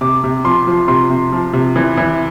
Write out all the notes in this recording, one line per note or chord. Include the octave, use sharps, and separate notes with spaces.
C3 D6
C3
F3 C6
F3
C3 C6
C3
F3
C3
E3
E3